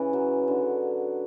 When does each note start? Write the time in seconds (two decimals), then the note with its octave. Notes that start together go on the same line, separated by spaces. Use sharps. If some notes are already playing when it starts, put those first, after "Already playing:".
Already playing: C#3 E3
0.13 F#3
0.48 D3